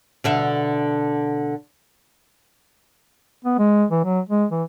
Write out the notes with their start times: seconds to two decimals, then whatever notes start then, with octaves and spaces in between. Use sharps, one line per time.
0.24 B2 D3 E5
3.45 B3
3.59 G#3
3.91 E3
4.05 F#3
4.29 G#3
4.52 E3